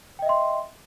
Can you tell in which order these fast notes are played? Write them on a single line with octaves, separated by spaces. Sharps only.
G5 D#5 E5 C6